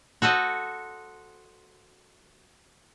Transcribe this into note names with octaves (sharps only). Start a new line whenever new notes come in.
F#4 A4 C5 D#5